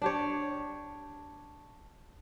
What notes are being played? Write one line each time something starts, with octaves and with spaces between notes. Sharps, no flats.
D4 G4 C#5